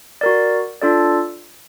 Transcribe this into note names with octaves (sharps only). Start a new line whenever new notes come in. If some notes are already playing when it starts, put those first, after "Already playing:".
F#4 A#4 D5
D4 F4 A4 D5